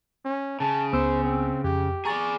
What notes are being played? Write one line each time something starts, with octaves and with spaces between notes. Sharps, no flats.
C#4
C#3 A5
C#2 B3 C5 E6
C4
F2 G4
G#4 D5 A#5 C#6 A6